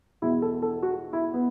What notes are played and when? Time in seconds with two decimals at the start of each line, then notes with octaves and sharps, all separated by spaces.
0.22 E2 B2 E4
0.42 A4
0.62 A4
0.83 F#4
1.13 E4
1.34 B3